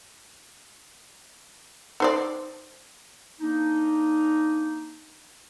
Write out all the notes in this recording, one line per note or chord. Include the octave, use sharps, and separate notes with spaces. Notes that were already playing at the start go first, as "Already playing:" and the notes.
D#4 C5 D5
A#3 D4 D#4